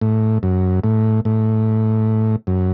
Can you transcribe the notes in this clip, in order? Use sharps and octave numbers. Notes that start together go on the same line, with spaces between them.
A2
F#2
A2
A2
F#2